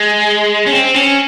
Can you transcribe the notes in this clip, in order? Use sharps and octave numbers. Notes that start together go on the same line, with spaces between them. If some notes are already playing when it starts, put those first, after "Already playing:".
Already playing: G#3
C#4
C4
C#4